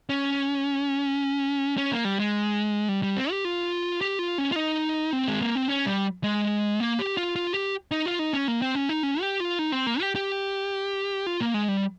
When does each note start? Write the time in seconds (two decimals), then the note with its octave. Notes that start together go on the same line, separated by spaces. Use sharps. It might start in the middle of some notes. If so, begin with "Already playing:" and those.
0.09 C#4
1.78 C#4
1.92 A#3
2.05 G3
2.20 G#3
2.89 G3
3.03 G3
3.17 C4
3.31 G4
3.45 F4
4.01 G4
4.19 F4
4.38 C#4
4.52 F4
4.56 D#4
5.13 C4
5.28 G#3
5.42 A#3
5.55 C4
5.68 C#4
5.86 G3
6.24 G#3
6.80 A#3
6.99 G4
7.17 F4
7.36 F4
7.54 G4
7.91 D#4
8.06 F4
8.19 D#4
8.33 C#4
8.48 A#3
8.62 C4
8.75 C#4
8.89 D#4
9.03 C#4
9.21 G4
9.40 F4
9.59 D#4
9.72 C4
9.87 A#3
10.01 G4
10.15 G4
11.26 F4
11.41 A#3
11.54 G#3
11.68 G3